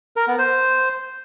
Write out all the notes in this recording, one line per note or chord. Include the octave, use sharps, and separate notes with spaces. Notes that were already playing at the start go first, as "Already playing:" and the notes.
A#4
B3
C5